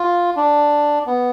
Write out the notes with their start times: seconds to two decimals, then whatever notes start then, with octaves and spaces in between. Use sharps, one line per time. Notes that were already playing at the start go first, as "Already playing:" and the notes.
Already playing: F4
0.36 D4
1.06 B3